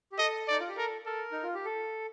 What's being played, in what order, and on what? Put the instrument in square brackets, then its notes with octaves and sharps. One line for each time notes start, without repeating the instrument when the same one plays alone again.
[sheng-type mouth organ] G4
[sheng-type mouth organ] A4 [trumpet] D#5
[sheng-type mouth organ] D#4 [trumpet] D5
[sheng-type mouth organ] F4
G4
[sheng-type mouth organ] A4 [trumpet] A#4
[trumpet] A4 [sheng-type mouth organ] A#4
[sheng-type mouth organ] D#4
F4
G4
A4